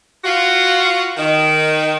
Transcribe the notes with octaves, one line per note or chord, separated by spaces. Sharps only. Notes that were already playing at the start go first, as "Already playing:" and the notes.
F4 F#4
D#3